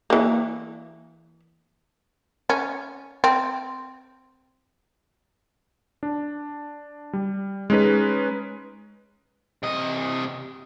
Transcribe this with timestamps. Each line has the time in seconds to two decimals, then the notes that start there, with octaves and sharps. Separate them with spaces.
0.10 E3 A#3
2.50 C#4
3.24 C4
6.03 D4
7.13 G3
7.70 G#3 C#4 D#4 B4
9.63 C3 D#5